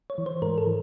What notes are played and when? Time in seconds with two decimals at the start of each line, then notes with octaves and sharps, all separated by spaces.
0.10 C#5
0.18 E3
0.26 C5
0.42 G#2 A#4
0.58 A4
0.67 E3